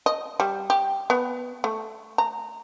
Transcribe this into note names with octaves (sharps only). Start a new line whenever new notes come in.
D#5
G3
G4
B3
A3
A#5